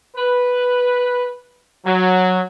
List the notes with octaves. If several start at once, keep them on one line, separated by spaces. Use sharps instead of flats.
B4
F#3